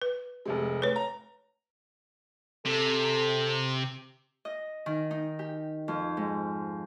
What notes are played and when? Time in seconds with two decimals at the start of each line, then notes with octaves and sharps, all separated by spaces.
0.02 B4
0.46 F1 C3 G#3
0.82 A2 B4 C#5
0.96 A#5
2.66 C3 A4
4.45 D#5
4.86 D#3
5.11 D#4
5.39 G4
5.88 F2
6.17 G#2